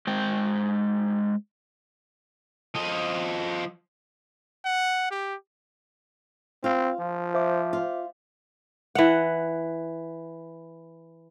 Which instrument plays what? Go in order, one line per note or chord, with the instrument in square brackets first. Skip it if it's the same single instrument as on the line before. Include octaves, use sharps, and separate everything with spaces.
[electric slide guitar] G#3 C5 G5
[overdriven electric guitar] F3 D#5
[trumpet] F#5
G4
[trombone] C4 [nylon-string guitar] F4
[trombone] F3
[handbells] C5 E5 D6
[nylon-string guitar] F4
[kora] E3 F#5